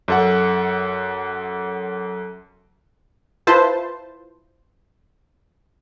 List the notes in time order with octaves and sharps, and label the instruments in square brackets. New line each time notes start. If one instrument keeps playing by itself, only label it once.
[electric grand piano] F#2 A4 F#5
[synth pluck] E4 F4 B4 C5 A5